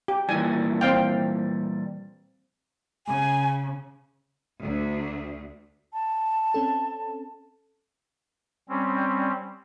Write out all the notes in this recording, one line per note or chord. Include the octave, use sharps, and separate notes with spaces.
G4
A#2 E3 G3 G#5
C4 F5 G5
C#3 G#5
D2
A5
C4 C#4 A4
G3 C4 C#4